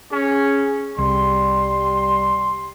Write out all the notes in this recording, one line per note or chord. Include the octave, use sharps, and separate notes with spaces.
C#4 G#4
C2 G3 C6